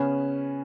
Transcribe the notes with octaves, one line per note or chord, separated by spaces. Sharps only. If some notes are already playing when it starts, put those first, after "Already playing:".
Already playing: C#3 B3 C#4 G#4 B4